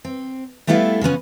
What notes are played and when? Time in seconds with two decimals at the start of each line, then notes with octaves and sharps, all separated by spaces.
0.05 C4
0.67 G3 A3 B3 E4 A4 F5
1.01 C#3 F3 B3 C#4